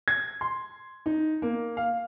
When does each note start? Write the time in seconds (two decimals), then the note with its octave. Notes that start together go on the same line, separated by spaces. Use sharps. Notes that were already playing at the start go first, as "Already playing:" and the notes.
0.08 G#6
0.41 C6
1.06 D#4
1.42 A#3
1.77 F5